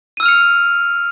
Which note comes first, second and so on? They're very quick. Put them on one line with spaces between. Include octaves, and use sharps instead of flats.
D#7 E6 F6 F7 C#7